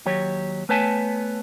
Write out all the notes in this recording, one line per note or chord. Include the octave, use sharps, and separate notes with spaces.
D#2 F#3 G4 C#5
A3 B3 B4 C#5 G#5 A5